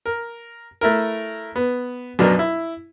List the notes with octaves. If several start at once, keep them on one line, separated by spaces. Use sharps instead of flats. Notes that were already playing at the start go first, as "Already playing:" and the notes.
A#4
A3 E4 A#4
B3
F#2 B2 F#3 D4 A#4
E4